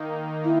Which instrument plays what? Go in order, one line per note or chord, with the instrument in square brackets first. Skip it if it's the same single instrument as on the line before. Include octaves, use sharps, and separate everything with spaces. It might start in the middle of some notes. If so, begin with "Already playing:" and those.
Already playing: [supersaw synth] D#3 A#3 D#4
[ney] E4